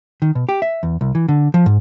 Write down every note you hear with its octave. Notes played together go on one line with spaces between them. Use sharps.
D#3
B2
G4
E5
E2
C2
E3
D3
F3
G#2